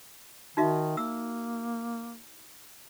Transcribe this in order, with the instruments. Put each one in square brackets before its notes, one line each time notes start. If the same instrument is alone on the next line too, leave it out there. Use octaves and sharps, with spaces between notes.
[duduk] D#3 [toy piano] D#4 F#4 E5
[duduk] A#3 [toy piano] E6